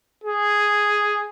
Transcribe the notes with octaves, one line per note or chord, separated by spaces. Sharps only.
G#4